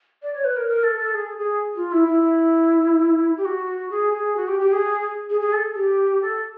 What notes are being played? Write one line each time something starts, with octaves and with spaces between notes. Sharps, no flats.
D5
C#5
B4
A#4
A#4
A4
A4
G#4
G#4
F4
E4
E4
G4
F#4
G#4
G#4
F#4
G4
G4
G#4
G#4
G#4
A4
G4
A4